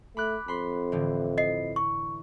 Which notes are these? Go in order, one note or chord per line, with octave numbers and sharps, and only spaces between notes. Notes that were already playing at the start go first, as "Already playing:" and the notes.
A3 B5 D6 F#6
F2 B5 C6 B6
A2 D3 E3
D#5 C7
C#6